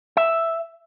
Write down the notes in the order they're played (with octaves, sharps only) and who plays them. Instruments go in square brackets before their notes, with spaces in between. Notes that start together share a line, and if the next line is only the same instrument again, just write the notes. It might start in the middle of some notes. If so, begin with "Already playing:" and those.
[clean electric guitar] E5